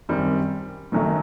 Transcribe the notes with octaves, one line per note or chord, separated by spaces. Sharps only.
F#2 D#3 G3 C4
F#1 F#2 D#3 F#3 A3